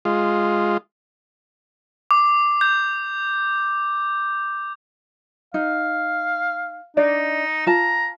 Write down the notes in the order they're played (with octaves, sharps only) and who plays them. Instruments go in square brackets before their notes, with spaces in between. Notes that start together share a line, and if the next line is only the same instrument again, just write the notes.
[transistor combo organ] G#3 F4
[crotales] D6
G6
[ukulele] D#4 [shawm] F5
[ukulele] D4 D5 D#5 [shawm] D#4
[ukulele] F4 A5 [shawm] A#5